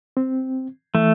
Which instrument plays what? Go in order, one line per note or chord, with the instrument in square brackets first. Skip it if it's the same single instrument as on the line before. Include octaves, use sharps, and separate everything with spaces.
[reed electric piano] C4
[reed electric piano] E3 [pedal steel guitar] A3